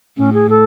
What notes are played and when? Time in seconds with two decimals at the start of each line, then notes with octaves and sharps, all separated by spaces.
0.18 A2 C#4
0.33 G#4
0.50 A4